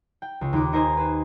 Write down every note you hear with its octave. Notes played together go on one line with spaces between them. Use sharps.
G5
C#2
D#2 D6
D#4 A#4 C5 D#5 G#5
B4 C5